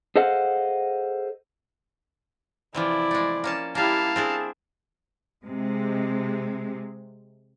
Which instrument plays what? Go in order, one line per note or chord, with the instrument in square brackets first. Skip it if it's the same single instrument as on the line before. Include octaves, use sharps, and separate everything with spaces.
[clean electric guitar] G#4 A4 C5 D#5 F5 F#5
[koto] C3 E3 F3 [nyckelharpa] E4 D5
[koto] G#3 A3
A#3 C#4 A5
[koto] G3 A#3 [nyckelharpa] E4 G4 [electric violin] F5 A5
[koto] C4 D4 E4 [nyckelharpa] G#4
[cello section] C3 G#3